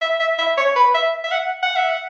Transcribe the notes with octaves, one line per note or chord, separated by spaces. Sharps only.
E5
E5
E5
C#5
B4
E5
E5
F#5
F#5
E5
F#5